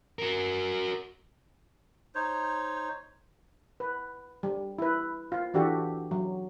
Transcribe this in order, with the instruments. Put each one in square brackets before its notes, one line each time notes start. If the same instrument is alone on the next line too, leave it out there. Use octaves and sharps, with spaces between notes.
[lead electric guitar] F#4 A#4
[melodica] D#4 C5 C#5
[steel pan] B4
G3
E4 B4
F4
E3 D4 F#4 G4 A4
F#3